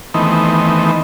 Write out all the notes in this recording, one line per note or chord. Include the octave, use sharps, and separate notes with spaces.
D#3 E3 A3 B3 C4 D#4